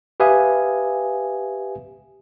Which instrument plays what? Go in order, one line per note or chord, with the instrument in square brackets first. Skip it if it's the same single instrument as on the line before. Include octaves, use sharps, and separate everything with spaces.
[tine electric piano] G4 B4 E5 F5 G#5 D#6